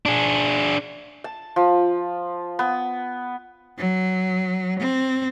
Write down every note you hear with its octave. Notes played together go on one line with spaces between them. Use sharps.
D4 G#4
A5
F3
B3
F#3
C4